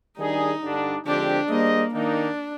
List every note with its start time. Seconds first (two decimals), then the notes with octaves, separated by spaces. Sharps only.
0.18 D#3 G3 D4 D#4 G#4
0.62 G2 D3 G3 D4
1.05 D3 F3 G#3 C4 D4 G4
1.49 G3 A#3 D4 G#4 C5 D#5
1.93 D#3 A#3 D4 D#4